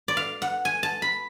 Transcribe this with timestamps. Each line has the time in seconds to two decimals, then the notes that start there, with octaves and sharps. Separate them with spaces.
0.08 D5
0.17 F5
0.42 F#5
0.65 G#5
0.83 A5
1.02 B5